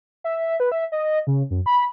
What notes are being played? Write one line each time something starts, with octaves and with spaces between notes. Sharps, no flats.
E5
B4
E5
D#5
C#3
F#2
B5